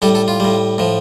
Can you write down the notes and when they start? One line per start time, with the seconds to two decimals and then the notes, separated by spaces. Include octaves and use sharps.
0.02 A2 G3 A4
0.15 A4
0.28 F4
0.40 A2 G3
0.78 A2 F3